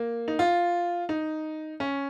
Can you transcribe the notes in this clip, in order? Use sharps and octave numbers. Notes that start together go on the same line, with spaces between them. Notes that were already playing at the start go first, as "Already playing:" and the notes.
Already playing: A#3
D#4
F4
D#4
C#4